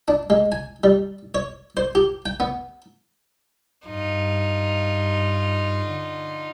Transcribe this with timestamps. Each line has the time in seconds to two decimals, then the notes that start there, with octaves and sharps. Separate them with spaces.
0.08 D4
0.30 G#3
0.52 G#5
0.84 G3
1.35 C#5
1.77 C5
1.95 G4
2.26 G5
2.40 B3
3.87 G2 D#4 F4
5.86 D3